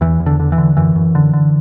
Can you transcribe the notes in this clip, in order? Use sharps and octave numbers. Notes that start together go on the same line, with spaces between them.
E2 E3
E2
D3
D3
E3
D3
F#2 E3
F#2
D3
D3